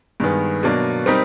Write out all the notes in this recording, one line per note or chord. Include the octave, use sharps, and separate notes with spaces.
G2 D#3 G#3 B3
B2 F#3 A#3 D4
G3 C4 D#4 G4 A#4